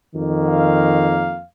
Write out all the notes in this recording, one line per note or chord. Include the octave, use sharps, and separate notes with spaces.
F2 D#3 A#3
F5